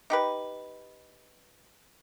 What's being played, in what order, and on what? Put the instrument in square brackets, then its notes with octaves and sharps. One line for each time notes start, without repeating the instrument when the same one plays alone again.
[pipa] D#4 G4 B4